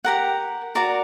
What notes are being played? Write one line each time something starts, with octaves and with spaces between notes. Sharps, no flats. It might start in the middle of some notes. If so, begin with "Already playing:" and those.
G4 A#4 F#5
F#4 A#4 D5